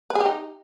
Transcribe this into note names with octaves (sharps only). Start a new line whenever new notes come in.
B4
G#4
G4
D#4